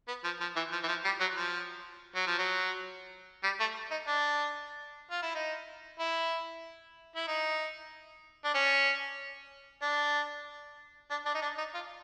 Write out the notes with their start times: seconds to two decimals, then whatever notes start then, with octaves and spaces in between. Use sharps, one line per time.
0.08 B3
0.24 F3
0.41 F3
0.56 E3
0.72 F3
0.83 E3
0.88 F3
1.05 G3
1.20 F#3
1.36 F3
2.15 F#3
2.27 F3
2.39 F#3
3.44 G3
3.60 A3
3.91 D#4
4.08 D4
5.11 F4
5.22 E4
5.35 D#4
5.99 E4
7.16 E4
7.27 D#4
8.45 D4
8.54 C#4
9.82 D4
11.10 D4
11.26 D4
11.35 D#4
11.42 D4
11.58 D#4
11.74 F4